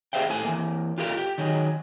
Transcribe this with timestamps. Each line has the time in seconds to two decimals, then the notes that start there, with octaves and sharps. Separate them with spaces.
0.13 G4 G#4 C5 E5 F5 G5
0.30 A2 A4 G#5
0.45 E3 A#3
0.98 F4 G4 A4 A#4 F5
1.17 G4
1.38 D#3 F#3 G#4